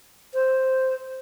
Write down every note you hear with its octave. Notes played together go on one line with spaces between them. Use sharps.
C5